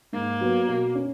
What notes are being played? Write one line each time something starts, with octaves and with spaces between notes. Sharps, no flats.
G#2 A#3
F#3 B3
B2
C#4